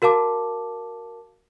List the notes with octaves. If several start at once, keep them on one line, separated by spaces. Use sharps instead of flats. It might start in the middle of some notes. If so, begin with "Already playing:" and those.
F#4 A#4 F5 A5 D6